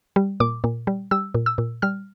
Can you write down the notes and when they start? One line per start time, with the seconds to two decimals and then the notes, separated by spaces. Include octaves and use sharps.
0.16 G3
0.40 A#2 D6
0.64 A#2
0.87 G3
1.11 G3 E6
1.34 A#2
1.46 E6
1.58 A#2
1.82 G3 F6